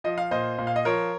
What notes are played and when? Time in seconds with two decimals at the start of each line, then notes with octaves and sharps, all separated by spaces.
0.04 F3 D#5
0.18 F5
0.31 A#2 C5 D#5
0.58 A#2
0.67 F5
0.76 D#5
0.85 F3 A#4 C#5